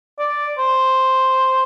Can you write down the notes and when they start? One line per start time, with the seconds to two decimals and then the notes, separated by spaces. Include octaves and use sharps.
0.19 D5
0.58 C5